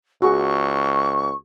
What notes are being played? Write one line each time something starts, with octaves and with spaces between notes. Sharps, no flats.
C#2 F#4 G#4 C#6